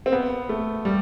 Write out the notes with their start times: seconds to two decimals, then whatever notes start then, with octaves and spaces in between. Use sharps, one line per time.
0.06 C4
0.12 B3
0.49 A3
0.85 G3